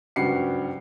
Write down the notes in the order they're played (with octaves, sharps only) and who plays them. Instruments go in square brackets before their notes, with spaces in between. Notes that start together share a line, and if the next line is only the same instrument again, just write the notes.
[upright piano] F#1 C#2 G2 F#4 C7 C#7